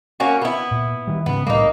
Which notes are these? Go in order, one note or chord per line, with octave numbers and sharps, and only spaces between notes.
A#3 C#4 F#4
B3 E4
A#2
D#3 G3
G#2 C#3 B3
C2 A2 G3 A#3 D#4